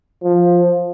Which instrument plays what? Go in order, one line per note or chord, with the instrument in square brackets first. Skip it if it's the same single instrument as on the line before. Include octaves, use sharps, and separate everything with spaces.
[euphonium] F3